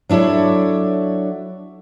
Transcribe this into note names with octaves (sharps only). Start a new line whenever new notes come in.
F#3 D4 E4 A4 C#5